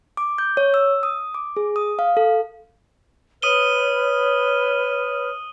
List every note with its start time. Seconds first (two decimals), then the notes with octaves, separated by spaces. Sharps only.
0.17 D6
0.38 G6
0.57 C#5
0.74 E6
1.03 D#6
1.34 D6
1.57 G#4
1.76 D#6
1.99 F5
2.17 A4
3.42 B4 C#5 D#6 F6 D#7 G7